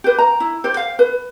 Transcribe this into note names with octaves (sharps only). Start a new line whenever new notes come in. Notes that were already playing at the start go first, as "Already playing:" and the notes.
G4 B4
A#5
E4
G4 C5
F5
B4